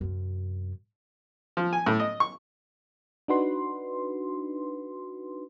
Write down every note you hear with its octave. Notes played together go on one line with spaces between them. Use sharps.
F#2 C3
F3
G#5
A2
D#5
C#6
D4 D#4 F#4 B4 C6